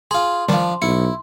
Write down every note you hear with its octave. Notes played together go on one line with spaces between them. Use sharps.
F4 G#4 C6
D#3 F3 G3 D4
B1 E4 C#7